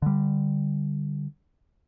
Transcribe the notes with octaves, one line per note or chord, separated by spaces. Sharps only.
D3 G3